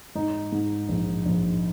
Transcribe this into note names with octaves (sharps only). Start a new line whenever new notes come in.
G#2 D#4
G#2
A#1
A#1